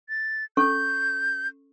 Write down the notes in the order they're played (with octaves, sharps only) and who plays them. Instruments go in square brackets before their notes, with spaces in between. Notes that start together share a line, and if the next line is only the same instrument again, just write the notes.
[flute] A6
[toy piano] C#4 A4 C#6 [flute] G6